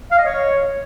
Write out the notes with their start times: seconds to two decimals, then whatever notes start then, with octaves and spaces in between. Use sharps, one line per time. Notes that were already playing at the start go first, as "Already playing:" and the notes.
0.12 F5
0.18 D#5
0.25 C#5